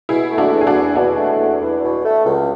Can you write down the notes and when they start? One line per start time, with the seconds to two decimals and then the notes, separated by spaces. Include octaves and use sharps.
0.09 B2 E4 G#4
0.31 A3
0.38 D4 F#4
0.53 E2
0.61 G#4
0.67 D4 F#4
0.74 E2
0.95 B2 D4 F#4
1.18 A3
1.39 E2
1.61 E2
1.83 B2
2.04 A3
2.25 C#2